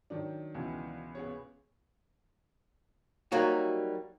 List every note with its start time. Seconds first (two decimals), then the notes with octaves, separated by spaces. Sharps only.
0.10 D#3 F#3 D4
0.54 C#2 B2 E3
1.15 B3 G#4 C#5
3.32 F#3 G3 A#3 D#4 F#4